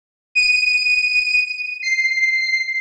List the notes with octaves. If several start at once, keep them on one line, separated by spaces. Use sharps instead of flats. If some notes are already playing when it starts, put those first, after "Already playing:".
D#7
C7